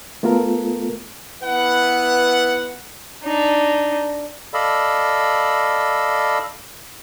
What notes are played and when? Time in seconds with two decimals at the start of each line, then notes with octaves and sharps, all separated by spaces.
0.23 A3 B3 F4 A4 A#4
1.43 B3 E4 B4 F#5
3.24 D4 D#4
4.54 A4 D5 D#5 F5 B5 E6